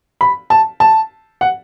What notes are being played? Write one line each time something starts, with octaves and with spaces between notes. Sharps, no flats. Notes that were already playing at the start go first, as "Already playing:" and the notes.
B5
A5
A5
F#5